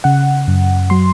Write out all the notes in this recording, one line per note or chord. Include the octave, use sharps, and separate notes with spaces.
C#3 F#5
F#2
F#3 C6